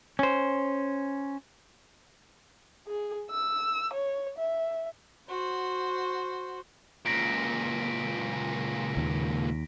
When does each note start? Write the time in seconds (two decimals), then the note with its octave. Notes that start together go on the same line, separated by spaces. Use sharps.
0.19 C#4 C5
2.87 G#4
3.30 E6
3.93 C#5
4.38 E5
5.29 F#4 C5
7.06 C#2 A#2 A#6 B6 D7
8.97 D#2